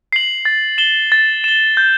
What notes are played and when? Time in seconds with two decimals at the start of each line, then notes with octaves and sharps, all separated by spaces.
0.13 C7 F#7
0.45 A6
0.78 E7 G7
1.12 A6
1.44 E7 G7
1.77 G6